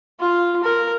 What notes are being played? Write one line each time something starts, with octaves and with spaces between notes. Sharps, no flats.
F4
A#4